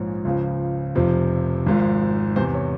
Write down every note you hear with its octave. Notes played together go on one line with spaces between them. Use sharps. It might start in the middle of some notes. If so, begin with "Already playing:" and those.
Already playing: A#1 G#2 F3 C#5
C#2 C#3 F3
F1 F2 C3 F3
G#1 G#2 F3
E2 C3 E3 C5
C#5